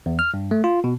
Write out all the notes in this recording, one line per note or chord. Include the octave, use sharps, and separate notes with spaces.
E2
F6
G2
A3
F4
B2